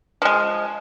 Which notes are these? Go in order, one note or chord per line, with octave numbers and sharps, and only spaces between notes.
F3 G#3